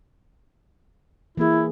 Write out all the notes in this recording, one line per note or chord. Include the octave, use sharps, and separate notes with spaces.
E3 A#3 E4 G#4